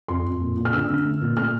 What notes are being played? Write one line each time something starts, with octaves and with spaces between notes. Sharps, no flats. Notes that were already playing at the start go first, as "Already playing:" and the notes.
F2 C6
F2
A#2
A#2
F6
D3 E6
D3
A3
A#2
A3 F6